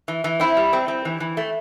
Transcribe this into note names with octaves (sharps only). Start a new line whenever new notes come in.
E3
E3
C4 E4
G3
C4
C4
E3
E3
A3